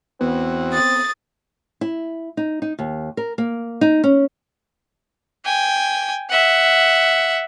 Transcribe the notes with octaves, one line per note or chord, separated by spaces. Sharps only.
E2 B3 C4 F#4
D#6 A6
E4
D#4
D#4
D#2
A#4
A#3
D#4
C#4
G5 G#5
E5 F#5